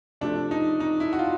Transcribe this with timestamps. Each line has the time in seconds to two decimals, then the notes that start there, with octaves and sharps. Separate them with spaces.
0.21 C3 F3 A3 D4
0.51 D#4
0.80 D#4
1.00 E4
1.13 F#4
1.19 F4